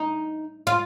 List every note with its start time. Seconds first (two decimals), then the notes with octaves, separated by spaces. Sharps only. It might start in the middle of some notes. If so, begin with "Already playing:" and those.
Already playing: D#4
0.67 F4